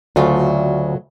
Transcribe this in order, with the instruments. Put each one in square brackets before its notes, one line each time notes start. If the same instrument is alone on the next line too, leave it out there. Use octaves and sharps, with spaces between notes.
[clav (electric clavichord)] D2 C#3 [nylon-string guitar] F#3 A3 F4